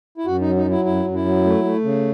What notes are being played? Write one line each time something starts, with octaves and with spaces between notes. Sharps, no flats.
E4
F#2 F#4
D#4
F#3
D#4
F#3 E4
F#2 E4
F#2
E4
F#3
A3
A3
C#3